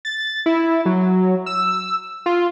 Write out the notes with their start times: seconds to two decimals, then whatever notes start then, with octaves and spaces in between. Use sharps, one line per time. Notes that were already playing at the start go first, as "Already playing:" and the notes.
0.05 A6
0.46 E4
0.86 F#3
1.46 E6
2.26 F4